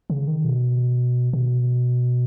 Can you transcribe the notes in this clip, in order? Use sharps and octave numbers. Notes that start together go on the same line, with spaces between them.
C#3
D#3
B2
B2